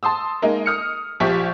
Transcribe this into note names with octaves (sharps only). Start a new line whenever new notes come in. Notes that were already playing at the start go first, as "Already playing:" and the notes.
A5 C6 D#6 E6
G#3 A#3 D#4
D#6 F6 C#7
A#1 F3 G4 C#6 B6